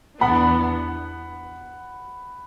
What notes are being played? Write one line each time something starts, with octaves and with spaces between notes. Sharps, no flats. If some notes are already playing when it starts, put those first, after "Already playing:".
E2 E3 B3 D4 F#5 B5